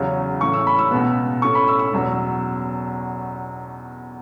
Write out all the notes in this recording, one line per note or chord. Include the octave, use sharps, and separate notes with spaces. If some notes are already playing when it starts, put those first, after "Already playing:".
Already playing: E2 C#3 F#3 C#4
A2 E3 C#4 C#6
E6
B5
E6
C#2 B2 B3
A2 A3 C#4 C#6
B5
E6
E6
E2 B2 F#3 C#4